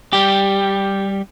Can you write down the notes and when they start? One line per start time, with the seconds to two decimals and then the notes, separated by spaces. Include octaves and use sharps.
0.13 G3 G4